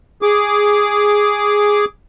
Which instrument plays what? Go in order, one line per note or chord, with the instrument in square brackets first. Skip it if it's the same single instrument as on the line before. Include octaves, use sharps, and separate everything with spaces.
[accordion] G#4 D6